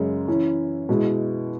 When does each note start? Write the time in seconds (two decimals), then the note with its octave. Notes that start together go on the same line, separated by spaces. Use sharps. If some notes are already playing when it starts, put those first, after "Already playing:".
Already playing: F#2 C#3 G#3 C#4
0.28 E3 C#4 E4
0.89 B2 G#3 E4